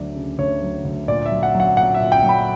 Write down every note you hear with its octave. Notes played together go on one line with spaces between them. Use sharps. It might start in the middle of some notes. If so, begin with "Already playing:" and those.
Already playing: D2 F#3 D5
C#3
D2 C#5
F#3
D2
A#2 D5
E5
F#3
F#5
F#3
F#5
A#2 F#5
E5
A#2
G5
F#3
B5